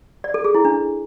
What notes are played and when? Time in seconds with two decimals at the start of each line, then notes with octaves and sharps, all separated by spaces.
0.24 D5
0.34 A4
0.44 G#4
0.55 E4
0.65 D4